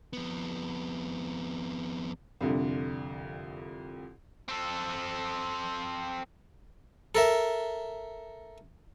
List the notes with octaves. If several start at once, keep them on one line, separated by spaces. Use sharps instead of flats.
F2 B3
C2 F2 D3
C4 A4
A4 A#4 E5